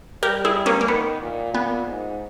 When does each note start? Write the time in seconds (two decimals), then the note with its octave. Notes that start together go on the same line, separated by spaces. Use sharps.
0.23 G3 G4 A#4
0.45 E4 G#4
0.66 A#3 C#4
0.81 A#3
0.88 D#3 B3
1.22 A#2
1.54 A#2 B3
1.87 G#2